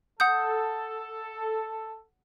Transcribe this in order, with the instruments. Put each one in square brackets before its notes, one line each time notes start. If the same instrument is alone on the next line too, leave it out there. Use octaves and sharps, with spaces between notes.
[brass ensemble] A4 [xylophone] F#5 D#6 G6